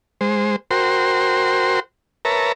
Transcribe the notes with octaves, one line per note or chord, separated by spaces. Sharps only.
G#3 C5
F#4 A#4 C5 G5 C6
A#4 B4 C#5 E5 A5 A#5